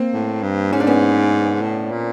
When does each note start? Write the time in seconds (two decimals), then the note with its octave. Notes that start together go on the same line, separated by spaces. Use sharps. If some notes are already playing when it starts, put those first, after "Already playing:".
Already playing: A#3 C4
0.13 A2
0.43 G2
0.72 G#2 C#4
0.80 D4
0.87 B3 C#4
1.62 A2
1.92 A#2